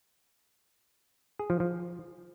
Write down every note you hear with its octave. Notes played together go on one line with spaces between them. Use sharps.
G#4
F3
F3